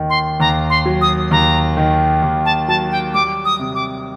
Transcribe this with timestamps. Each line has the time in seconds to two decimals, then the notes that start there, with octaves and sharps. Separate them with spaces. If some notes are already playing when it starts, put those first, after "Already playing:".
Already playing: D#2 D#3
0.10 C6
0.40 D#2 A#5
0.70 C6
0.85 F#3
1.01 D#6
1.31 D#2 A#5
1.77 D#3
2.22 D#2
2.45 A5
2.68 F#3 A5
2.91 G5
3.14 G3 D6
3.45 D#6
3.59 C3
3.75 D6